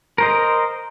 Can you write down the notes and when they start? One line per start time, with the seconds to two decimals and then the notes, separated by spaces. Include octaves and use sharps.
0.18 A#4 C5 D#5